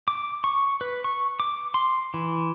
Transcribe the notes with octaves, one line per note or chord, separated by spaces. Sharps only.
D6
C#6
B4
C#6
D6
C6
E3